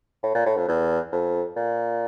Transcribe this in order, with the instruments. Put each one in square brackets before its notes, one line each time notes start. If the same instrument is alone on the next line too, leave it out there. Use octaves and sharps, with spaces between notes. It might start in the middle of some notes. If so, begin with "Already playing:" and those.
[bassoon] A2
A#2
A2
F2
E2
F2
A#2